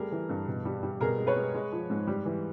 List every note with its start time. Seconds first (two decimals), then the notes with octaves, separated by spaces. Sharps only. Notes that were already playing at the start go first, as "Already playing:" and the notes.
Already playing: G3 A3 G#4 A#4
0.12 E3
0.29 G2
0.47 B2
0.65 G3
0.83 G3
1.01 B2 G#4 A#4
1.18 G#3
1.27 B4 C#5
1.36 G#3
1.54 G#3
1.72 F3
1.90 G#2
2.07 G3
2.25 E3